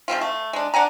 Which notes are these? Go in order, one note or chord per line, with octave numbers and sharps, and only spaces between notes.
F3 G#3 C4 F4
A3
G#3 D4
D4 F#5 G#5 A#5